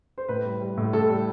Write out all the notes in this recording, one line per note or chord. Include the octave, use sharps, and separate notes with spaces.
C5
A2 B4
G3
G3
A2
A2 A4
G3